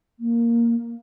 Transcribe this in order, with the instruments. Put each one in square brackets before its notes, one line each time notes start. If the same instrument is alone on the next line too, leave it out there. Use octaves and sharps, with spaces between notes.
[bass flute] A#3